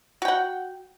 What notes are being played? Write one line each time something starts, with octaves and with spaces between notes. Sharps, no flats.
F#4 F#5 G5